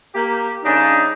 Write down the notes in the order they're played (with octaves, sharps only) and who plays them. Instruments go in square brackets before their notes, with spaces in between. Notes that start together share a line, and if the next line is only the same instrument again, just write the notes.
[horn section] A#3 G4
[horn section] G2 C#3 D4 [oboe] D#4